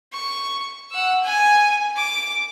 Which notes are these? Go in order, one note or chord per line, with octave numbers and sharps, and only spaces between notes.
C#6
F#5 E6
G#5
D6